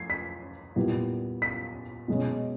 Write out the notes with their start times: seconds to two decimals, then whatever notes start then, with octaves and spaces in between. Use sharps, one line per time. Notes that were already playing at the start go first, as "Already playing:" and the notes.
Already playing: F3 A3 G#6 C7
0.10 B6
0.76 A#2 G3 B3 E4
1.42 B6
2.08 B2 G#3 C#4